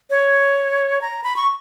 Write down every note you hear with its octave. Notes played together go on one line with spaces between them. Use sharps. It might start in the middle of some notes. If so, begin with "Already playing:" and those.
C#5
A#5
B5
C#6